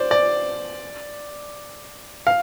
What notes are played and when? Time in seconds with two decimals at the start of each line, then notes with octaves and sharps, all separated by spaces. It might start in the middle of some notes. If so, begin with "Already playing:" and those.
Already playing: C5 D5
0.11 D5
2.27 F5